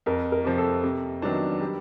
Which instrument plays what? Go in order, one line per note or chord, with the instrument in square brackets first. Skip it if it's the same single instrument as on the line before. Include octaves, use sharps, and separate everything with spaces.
[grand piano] F2 [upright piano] A#4
[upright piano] A#4
[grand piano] C3 F3
[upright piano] A4
[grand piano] C3
D#3 F#3 B3 D4
G3